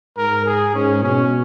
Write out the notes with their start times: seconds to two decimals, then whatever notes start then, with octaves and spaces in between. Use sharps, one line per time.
0.17 G#2 A#4
0.45 G#4
0.74 G#2 C#4
1.03 B2 C#4